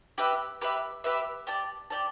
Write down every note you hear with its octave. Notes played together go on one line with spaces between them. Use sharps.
G4 B4 E5
G4 B4 E5
G4 B4 E5
G4 D5 A5
G4 D5 A5